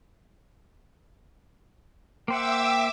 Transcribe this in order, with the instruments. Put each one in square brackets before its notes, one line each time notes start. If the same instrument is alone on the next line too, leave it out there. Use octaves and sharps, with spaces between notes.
[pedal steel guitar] A#3 C5 F#5 [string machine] E5 D6 E6 [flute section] G5